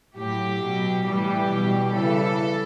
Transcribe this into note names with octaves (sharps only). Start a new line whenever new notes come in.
A2 F#3 G4
B2 F#3
A2 E3 G3 G4
B2 G3
C#3 E3 G3 A4